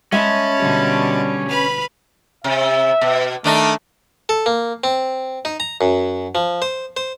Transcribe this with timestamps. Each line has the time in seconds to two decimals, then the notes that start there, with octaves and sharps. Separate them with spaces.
0.12 G#3 C#4 E5 A5 B5
0.59 B2 D3 G3
1.49 B4 B5 F6
2.44 C3 E5
3.01 B2
3.44 D#3 A3 D4 D#4
4.29 A4
4.46 A#3
4.84 C4
5.45 D#4
5.60 A#5
5.81 F#2
6.35 F3
6.62 C5
6.97 C5